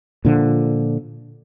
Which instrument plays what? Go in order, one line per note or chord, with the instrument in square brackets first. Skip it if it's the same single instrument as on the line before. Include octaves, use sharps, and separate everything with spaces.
[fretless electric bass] A#2 D3 F3